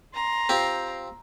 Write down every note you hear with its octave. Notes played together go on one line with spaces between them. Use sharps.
A#5 C6
C4 F4 G4